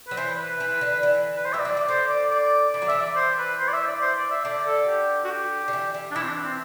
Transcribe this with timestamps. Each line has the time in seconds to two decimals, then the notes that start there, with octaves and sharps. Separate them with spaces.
0.08 F#3 B4
0.17 E3 C5
0.38 B4
0.60 E3
0.81 D3
1.03 E3
1.36 B4
1.45 C5
1.53 G3 E5
1.59 D5
1.65 F#3
1.74 E3 D5
1.88 D3 C5
2.09 D5
2.31 D5
2.73 E3 D5
2.82 F#3
2.88 E3 E5
3.02 D5
3.16 C5
3.38 B4
3.59 C5
3.69 D5
3.73 E5
3.87 D5
4.01 C5
4.17 D5
4.31 E5
4.44 D3 D5
4.66 A4
4.87 G4
5.24 F#4
5.30 G4
5.68 D3
5.73 E3
5.94 E3
6.11 D4
6.16 E3 E4
6.23 C4
6.29 D4
6.44 C4